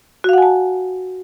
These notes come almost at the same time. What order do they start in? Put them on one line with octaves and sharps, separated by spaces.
F#4 F5 F#5 G#5 A5